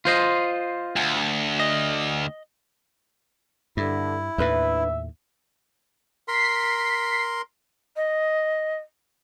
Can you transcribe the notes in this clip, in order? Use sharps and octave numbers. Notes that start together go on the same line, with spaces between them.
F4 C5 D#5
D2
D#5
G2 D3 E4
D#2 A2 D4 B4 E5
A#4 C6 B6 C7
D#5